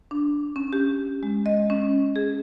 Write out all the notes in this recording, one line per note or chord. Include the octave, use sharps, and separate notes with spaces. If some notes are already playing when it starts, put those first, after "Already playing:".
D4
C#4
G4
G#3
D#5
C#4
G#4